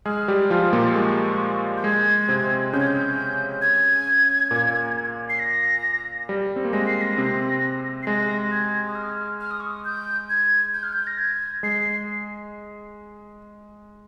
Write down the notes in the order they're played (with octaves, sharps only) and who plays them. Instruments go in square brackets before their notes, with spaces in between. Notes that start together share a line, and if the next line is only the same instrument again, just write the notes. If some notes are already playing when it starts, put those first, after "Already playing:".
[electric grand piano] G#3 G#4 [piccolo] F6
[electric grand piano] G3 G4
F3 F4
A#2 A#3
[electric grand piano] G#3 [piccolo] C#6
[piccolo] G6
[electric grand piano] G#3 [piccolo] G#6
[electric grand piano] C3 C4
[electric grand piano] C#3 C#4 [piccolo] G6
[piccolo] G#6
G6
G#6
[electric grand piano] A#2 A#3
[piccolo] C7
A#6
[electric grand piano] G3
C4
A#3
[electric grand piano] G#3 [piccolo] A#6
[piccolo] C7
A#6
[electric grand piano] C3 C4
[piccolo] C7
[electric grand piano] G#3 [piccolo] A#6
[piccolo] G#6
D#6
F6
F6
D#6
C#6
D#6
G6
G#6
G6
F6
G6
A#6
G#6
[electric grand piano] G#3 [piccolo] C7